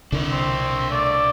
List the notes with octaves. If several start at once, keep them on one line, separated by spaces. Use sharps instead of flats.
C2 D3 D4 A#4
C4
A3 D5